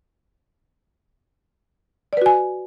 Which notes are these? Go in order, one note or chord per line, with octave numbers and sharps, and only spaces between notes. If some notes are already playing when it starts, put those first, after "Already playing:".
F#4 B4 D5 G#5